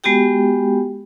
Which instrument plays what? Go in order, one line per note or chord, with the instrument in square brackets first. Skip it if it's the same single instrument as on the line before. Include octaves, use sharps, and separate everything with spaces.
[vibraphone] G#3 B3 F#4 G4 G5